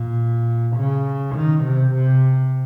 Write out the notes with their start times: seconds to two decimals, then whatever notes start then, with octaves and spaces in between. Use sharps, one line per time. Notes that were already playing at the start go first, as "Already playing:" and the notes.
Already playing: A#2
0.77 C#3
1.36 D#3
1.64 C3
1.95 C3